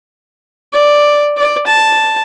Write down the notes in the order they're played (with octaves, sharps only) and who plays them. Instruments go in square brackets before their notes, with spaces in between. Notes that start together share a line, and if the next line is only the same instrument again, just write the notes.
[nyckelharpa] D5
D5
A5